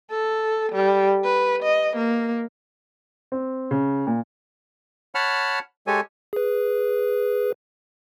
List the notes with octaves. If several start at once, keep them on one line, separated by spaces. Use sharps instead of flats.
A4
G3
B4
D#5
A#3
C4
C#3
A#2
C#5 F#5 A5 B5 F6
G#3 G4 A4 C#5 G#5
G#4 B4